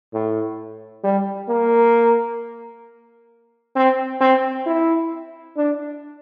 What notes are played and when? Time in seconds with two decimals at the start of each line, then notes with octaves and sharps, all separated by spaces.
0.13 A2
1.04 G3
1.48 A#3
3.76 C4
4.21 C4
4.66 E4
5.57 D4